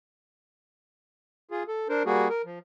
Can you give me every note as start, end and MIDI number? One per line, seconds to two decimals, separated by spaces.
1.51 1.63 65
1.51 1.63 68
1.68 1.88 69
1.89 2.03 62
1.89 2.03 70
1.89 2.03 72
2.06 2.28 55
2.06 2.28 58
2.06 2.28 66
2.06 2.28 68
2.29 2.42 70
2.45 2.59 53